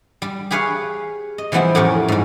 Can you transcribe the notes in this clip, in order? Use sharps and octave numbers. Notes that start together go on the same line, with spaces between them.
G3
G4 G#4 B4 C#5 F5
D#5
E3 F3 G3 B3 C4 E4
F2 A2 C#4 G4 A#4
G#2 G3